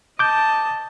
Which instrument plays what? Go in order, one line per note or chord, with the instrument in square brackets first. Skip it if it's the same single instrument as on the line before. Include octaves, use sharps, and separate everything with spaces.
[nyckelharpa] D#5 A5 [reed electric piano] D6 G6